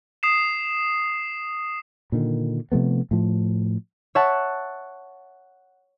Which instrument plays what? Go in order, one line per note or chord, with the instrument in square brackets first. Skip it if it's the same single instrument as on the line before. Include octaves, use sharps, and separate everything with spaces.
[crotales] D#6 C7 E7
[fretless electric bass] A#2 D3 D#3
C3 F3 A3 B3
A2 F3
[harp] C#5 E5 F#5 A5